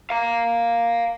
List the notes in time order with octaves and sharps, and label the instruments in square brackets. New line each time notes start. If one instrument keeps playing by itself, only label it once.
[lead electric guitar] F5 A#5